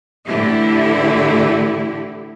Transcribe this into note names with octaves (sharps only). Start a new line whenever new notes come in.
A2 D3 E3 E4 G4